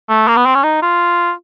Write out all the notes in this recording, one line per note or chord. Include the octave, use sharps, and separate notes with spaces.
A3
A#3
B3
C4
C#4
D#4
F4